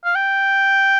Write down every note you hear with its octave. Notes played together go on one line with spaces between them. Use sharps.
F5
G5